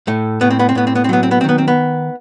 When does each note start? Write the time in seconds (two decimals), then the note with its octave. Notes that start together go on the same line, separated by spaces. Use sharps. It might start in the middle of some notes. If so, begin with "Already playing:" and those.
0.07 A2 A3
0.41 A2 B3
0.50 C4
0.59 B3
0.69 C4
0.75 A2 B3
0.87 C4
0.95 B3
1.04 C4
1.09 F#3 B3
1.23 C4
1.31 B3
1.41 C4
1.44 D#3 B3
1.58 C4
1.68 B3